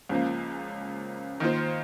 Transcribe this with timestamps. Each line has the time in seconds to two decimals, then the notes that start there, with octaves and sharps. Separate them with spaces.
0.09 C#2 C#3 F3 A#3
1.40 D#3 A#3 F4 C5